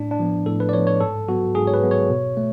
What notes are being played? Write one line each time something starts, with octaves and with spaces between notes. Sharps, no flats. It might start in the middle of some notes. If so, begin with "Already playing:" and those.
Already playing: A2 D4
D4
F3 B3
A2 A4
B4
D5
F3 B3 C#5
C#5
G#2 A4
F#3 B3 F#4
G#2 G#4
C#5
B4
F#3 B3
C#5
B2
A3